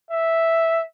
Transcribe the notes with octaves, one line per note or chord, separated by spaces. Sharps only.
E5